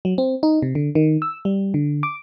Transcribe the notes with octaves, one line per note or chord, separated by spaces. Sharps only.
F#3
C4
D#4
C3
D3
D#3
E6
G3
D3
D6